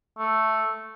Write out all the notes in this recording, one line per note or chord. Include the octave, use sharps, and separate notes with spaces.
A3